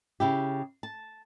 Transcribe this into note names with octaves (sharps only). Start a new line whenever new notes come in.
C#3 E4 G4
A5